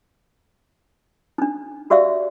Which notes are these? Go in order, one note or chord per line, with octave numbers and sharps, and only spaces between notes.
D4 D#4
F#4 G4 D5 E5 F5